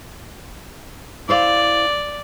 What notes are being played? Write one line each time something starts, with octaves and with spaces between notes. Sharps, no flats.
E4 C5 D5 F5